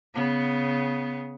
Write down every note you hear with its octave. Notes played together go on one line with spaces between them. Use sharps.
C#3 B3